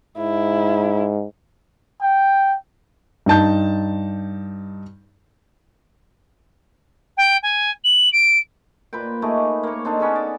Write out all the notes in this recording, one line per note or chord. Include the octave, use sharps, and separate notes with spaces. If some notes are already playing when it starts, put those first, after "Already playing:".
G#2 E4
G5
G2 D#4 A5 G6
G5
G#5
F#7
D7
A#2 B4 C5 G5
A3 D#4 G#4 D6
A#3 C#5
C4 D4 D#4 A4
B3 C#4 G#4 A4
D5